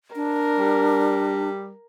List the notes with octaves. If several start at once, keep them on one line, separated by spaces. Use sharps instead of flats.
D4 A#4
G3